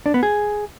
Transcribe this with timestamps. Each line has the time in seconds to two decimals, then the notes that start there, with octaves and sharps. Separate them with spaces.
0.06 D4
0.14 B3
0.23 G#4